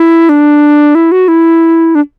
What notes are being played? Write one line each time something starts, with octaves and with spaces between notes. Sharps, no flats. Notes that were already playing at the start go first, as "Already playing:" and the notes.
Already playing: E4
D4
E4
F#4
E4
D4